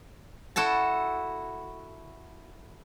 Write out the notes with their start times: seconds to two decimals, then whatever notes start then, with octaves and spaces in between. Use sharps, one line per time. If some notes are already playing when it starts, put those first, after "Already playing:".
0.56 E4 F#4 A4 A5